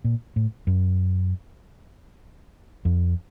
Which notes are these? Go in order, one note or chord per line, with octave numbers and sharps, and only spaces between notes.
A#2
A2
F#2
F2